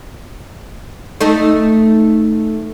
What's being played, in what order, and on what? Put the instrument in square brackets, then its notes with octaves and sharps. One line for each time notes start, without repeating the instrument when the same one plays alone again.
[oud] A3 D#4 A4